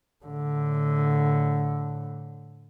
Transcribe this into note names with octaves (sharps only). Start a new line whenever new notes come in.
A2 D3